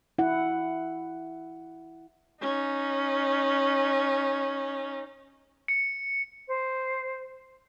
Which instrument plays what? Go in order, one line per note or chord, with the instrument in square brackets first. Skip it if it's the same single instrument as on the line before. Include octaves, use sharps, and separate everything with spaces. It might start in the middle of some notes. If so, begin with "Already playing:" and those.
[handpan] E4 F#5
[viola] C#4 D#4
[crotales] C#7
[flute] C5